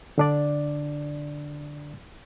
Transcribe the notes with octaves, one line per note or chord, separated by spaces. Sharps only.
D3 D4 D5